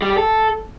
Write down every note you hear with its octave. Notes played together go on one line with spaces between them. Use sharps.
G3
G4
A4